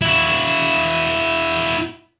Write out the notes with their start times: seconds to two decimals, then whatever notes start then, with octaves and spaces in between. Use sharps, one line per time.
0.01 E4 F#4